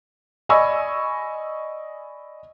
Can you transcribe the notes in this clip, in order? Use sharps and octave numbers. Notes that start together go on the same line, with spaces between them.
D5 D#5 G#5 B5 C#6 E6